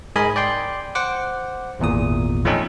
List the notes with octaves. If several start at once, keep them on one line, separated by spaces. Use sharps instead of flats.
G#2 G#4 A#4 D#5 G#5 B5
D5 G5 C6
C5 F#5 D6
G#1 E2 A#2 D#6
F3 A3 C4 C#4 D#4